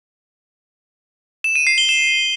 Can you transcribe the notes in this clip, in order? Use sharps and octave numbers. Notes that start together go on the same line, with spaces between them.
E7
D#7
C7
G7
E7